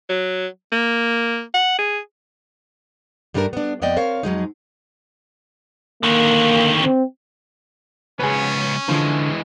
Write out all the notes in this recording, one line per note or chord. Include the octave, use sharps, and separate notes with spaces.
F#3
A#3
F#5
G#4
G2 G3 A3 D4 F4 A#4
B3 D4
F2 B3 D5 D#5 G5
C4 A#4 C#5 F5
F2 F#3 G#3 D#4
D3 D#3 A#3
C4
C#2 B3 C#4 G#4 B4
D3 E3 F3 G#3